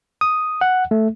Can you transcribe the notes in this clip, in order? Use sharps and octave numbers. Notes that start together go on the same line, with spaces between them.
D#6
F#5
A3